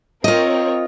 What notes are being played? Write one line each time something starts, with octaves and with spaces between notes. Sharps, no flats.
C4 F4 A#4 C#5 D#5